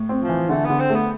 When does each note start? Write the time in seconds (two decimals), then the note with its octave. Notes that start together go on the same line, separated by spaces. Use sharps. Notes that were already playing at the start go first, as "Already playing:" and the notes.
Already playing: A2
0.09 C4
0.19 F3
0.29 E3
0.49 D3 A3
0.65 B3
0.70 D3
0.80 C4
0.90 A3
0.95 B3